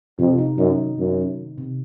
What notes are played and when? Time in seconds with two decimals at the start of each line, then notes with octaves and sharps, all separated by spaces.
0.19 F2 C3
0.38 D#4
0.58 F#2 D#4
0.78 D#3
0.98 F#2 A#3
1.18 A#3
1.37 D#3
1.58 C3